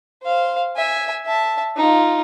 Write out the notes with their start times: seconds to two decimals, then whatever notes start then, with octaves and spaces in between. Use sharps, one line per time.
0.23 C5 F5
0.76 E5 G#5
1.26 E5 A5
1.77 D#4 F4